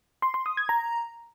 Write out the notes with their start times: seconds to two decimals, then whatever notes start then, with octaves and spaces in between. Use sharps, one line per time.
0.22 C6
0.34 C6
0.46 D#6
0.57 G#6
0.69 A#5